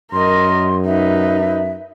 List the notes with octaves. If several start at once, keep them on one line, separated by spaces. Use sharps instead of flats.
F#2 A#4 D#5 C6
D#4 B4 E5